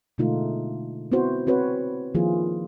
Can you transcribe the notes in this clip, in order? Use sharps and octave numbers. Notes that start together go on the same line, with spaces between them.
B2 D3 G#3 A3 D#4 F4
B3 C4 E4 F#4 C5
C4 F#4 B4 C#5
D#3 F3 A#3 E4 F4 G#4